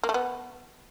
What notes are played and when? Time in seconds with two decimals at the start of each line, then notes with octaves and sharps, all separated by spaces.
0.04 A#3
0.09 A3
0.14 B3